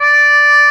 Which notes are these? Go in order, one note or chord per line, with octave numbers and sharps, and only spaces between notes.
D5